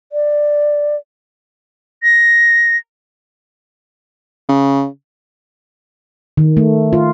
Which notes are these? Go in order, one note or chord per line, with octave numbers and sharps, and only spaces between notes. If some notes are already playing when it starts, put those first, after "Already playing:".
D5
A#6
C#3
D#3
A3
F4